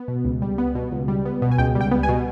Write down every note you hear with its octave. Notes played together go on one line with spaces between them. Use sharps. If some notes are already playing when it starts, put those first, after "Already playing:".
Already playing: B3
B2
C#2
G3
B3
B2
C#2
G3
B3
B2
G#5
C#2 G5
G3
G5
B3
G#5
B2